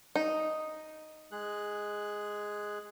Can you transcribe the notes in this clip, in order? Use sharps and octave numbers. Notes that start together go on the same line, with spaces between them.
D#4
G#3 G#4 F#6